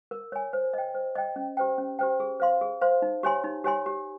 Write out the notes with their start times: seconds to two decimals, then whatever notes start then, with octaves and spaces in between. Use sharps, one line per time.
0.11 A#4
0.32 C#5 G#5
0.53 C5
0.73 D#5 G5
0.95 C5
1.15 D#5 G5
1.36 C#4
1.57 G4 C5 G5
1.78 C#4
1.99 G4 C5 G5
2.20 G#4
2.40 C5 F5 C6
2.61 G#4
2.81 C5 F5 C6
3.02 D#4
3.23 G4 C#5 G#5 C6
3.44 D#4
3.64 G4 C#5 G#5 C6
3.86 G4